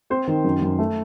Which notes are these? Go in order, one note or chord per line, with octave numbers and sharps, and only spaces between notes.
C4 C5
D#3
F#2
F#2
A3